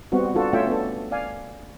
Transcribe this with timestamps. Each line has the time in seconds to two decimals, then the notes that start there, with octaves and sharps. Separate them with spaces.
0.12 G3 B3 C4 F#4
0.34 D4 F4 F#4 A4
0.53 A3 C#4 F4 C#5 E5 G5
0.67 B3 D4 A4
1.12 D5 F5 G#5